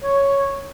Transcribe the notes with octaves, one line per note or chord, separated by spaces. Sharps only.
C#5